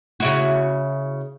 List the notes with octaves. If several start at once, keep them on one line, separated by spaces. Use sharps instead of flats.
C#3 E4 F#4